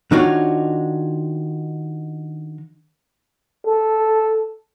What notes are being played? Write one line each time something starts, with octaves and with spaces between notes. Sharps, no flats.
D#3 D4 D#4 F4 F#4 C#5
A4